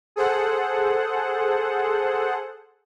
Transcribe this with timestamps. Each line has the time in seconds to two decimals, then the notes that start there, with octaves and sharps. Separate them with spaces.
0.16 G#4 A4 C5 F#5